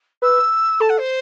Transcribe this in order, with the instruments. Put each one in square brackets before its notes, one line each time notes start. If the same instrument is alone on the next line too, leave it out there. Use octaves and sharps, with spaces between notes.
[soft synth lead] B4 [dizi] E6
[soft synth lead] A4 [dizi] A5
[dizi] F#5
C5